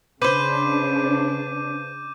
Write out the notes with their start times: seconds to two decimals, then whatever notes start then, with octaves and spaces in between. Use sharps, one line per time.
0.22 C#3 D4 B4 C5 D6 G6 D#7